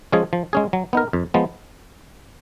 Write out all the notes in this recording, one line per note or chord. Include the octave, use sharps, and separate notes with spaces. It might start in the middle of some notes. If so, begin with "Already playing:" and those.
F3 G#3 C#4 G#4
F3
G#3 C#4 G#4
F#3
B3 D#4 A#4
F2
F3 G#3 B3